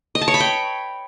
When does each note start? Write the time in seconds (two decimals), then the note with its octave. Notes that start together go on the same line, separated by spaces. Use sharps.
0.15 D#5
0.21 A5
0.28 C#5
0.34 B5
0.40 G5